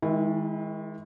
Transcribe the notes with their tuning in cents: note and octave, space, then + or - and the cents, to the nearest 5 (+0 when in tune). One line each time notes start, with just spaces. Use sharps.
D#3 +35 G#3 +0 E4 +0